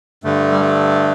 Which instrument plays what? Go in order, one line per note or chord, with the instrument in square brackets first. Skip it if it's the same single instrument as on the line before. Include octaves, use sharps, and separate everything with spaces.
[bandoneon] G2 D3 A3
G3
A3